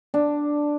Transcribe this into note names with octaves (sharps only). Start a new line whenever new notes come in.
D4